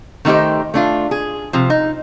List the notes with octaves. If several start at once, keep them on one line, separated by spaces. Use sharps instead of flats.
D#3 A3 D#4 G4 C5
A3 D4 F4
G#4
C3 F3
D#4